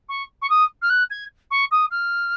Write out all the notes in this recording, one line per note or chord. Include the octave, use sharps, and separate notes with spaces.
C#6
C#6
D#6
F6
F#6
G#6
C#6
D#6
F6